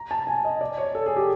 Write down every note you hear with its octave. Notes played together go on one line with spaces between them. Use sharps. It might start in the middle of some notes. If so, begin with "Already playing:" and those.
Already playing: A#5
A5
G#5
D#5
D5
C#5
A4
G#4
G4